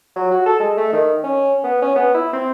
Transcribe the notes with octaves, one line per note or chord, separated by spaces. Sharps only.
F#3
F#4
A4
G#3
A3
D#3
C#4
B3
C#4
B3
E4
C4